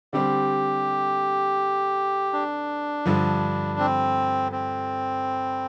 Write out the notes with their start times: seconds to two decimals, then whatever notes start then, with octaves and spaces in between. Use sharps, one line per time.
0.13 D3 G3 C4 G4
2.33 D4
3.06 G2 D3 F3
3.79 C4
4.52 C4